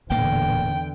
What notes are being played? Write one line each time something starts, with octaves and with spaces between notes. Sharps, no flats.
D1 E2 A#2 D3 A#3 G5